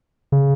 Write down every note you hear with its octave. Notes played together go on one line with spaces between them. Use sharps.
C#3